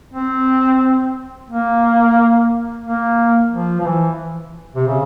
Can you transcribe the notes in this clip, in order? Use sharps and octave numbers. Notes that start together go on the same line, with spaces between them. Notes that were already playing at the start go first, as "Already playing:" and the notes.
C4
A#3
A#3
F3
F3
E3
C3
C#3